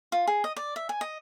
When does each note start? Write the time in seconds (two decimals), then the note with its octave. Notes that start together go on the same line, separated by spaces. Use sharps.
0.12 F4
0.27 G#4
0.44 D#5
0.57 D5
0.76 E5
0.89 G#5
1.01 D#5